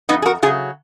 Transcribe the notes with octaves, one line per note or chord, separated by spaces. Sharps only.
F2 B3 D#4
G#4
F#4 A#4
C#3 F#3 F4 G#4